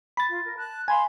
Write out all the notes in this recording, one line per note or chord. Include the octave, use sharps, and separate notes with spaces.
B5 A6
F4
A#4
A5 F#6
F5 G#5 B5 C6